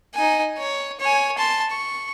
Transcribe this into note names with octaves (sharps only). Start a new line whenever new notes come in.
D#4 G#5
C#5
C#5 G#5
A5 C6
C#6